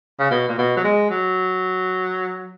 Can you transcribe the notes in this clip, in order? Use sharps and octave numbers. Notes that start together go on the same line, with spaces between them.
C#3
B2
A#2
B2
F#3
G#3
F#3